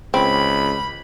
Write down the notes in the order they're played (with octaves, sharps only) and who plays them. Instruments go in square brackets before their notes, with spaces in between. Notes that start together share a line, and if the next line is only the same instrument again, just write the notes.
[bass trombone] C#2 [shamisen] C4 [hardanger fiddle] B5